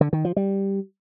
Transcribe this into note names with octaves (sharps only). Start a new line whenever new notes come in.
D3
D#3
F3
G3